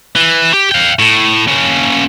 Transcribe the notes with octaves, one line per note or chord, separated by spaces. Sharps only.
E3
G4
F5 G5
A2
A#3 C#4